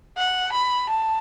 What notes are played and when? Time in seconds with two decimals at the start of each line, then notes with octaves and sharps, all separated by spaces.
0.17 F#5
0.53 B5
0.89 A5